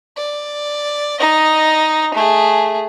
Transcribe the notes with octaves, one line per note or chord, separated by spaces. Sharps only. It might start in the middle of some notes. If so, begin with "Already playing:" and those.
D5
D#4 D#5
A3 G#4